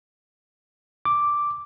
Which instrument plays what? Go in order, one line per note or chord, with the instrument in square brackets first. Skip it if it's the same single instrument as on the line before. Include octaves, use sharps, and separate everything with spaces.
[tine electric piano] D6